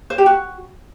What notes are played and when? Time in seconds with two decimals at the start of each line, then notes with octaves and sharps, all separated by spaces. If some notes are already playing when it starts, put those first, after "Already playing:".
0.10 C5
0.18 G4
0.26 F#4